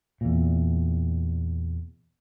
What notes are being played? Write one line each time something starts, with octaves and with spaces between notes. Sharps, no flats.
E2 A#2